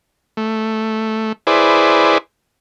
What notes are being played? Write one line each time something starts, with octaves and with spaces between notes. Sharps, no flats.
A3
E4 G#4 B4 C5 D5